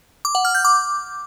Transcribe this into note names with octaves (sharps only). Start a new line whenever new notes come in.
D6
F#5
F6
G6
D6